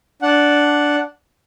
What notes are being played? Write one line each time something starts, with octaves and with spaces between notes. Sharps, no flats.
D4 F#5